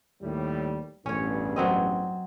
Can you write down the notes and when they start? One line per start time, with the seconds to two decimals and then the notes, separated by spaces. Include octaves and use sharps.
0.22 D#2 A2 G3
1.06 A1 E2 G2 C#4 C#5
1.56 F#3 C4 D#5